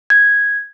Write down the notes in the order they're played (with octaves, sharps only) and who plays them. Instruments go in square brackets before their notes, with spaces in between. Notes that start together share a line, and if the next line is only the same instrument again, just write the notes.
[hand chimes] G#6